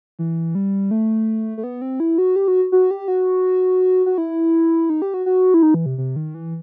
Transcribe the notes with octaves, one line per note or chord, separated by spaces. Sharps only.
E3
G3
A3
A3
B3
C4
E4
F#4
G4
F#4
F#4
G4
F#4
F#4
E4
D#4
G4
F#4
F#4
E4
D#4
E3
C3
C3
D#3
E3